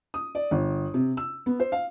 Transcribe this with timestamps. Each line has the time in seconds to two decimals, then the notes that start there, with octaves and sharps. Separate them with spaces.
0.14 D#6
0.35 D5
0.51 G1
0.94 C3
1.17 E6
1.46 B3
1.60 C5
1.72 F5